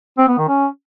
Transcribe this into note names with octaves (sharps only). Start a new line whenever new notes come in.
C4
B3
D#3
C#4